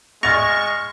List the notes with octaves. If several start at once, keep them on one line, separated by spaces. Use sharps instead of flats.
G#3 C#6 F6 A6 A#6 F7